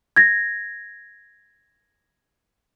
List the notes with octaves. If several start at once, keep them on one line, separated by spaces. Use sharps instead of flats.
G#6 A#6